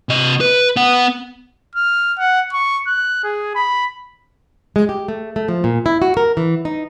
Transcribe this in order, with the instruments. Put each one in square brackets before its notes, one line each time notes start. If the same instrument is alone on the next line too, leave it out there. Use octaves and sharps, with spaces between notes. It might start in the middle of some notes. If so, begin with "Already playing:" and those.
[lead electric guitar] C3 D#5
B4
B3 F#5
[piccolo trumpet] F6
F#5
C#6
F#6
G#4
B5
[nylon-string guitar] G#3
G4
A3
A3
F3
A#2
E4
F#4
A#4
E3
D#4